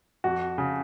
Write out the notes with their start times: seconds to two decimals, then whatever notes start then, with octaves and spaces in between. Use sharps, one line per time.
0.24 F2 F#4
0.58 C#3